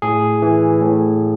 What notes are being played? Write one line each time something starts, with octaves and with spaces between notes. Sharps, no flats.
A2 G#4
E3
A2